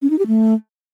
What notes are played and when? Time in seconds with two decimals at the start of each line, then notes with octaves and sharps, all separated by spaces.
0.02 C#4
0.10 D#4
0.19 G4
0.27 A3